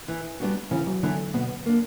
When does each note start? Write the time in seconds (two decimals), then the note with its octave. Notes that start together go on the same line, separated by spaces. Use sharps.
0.08 E3
0.40 G3 B3 D4 F#4
0.71 C#3 E3
0.87 F#3
1.03 D3 E3 B3 D4
1.34 B2 B3
1.66 A#3 D4